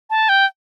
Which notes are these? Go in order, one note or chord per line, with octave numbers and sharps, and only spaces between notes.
A5
G5